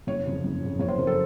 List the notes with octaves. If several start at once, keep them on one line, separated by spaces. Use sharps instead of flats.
F#1 C#5
F2 C#3 F3
F#1
F2 C#3 F3
F#1 C#5
C5
F2 C#3 F3 A#4
A4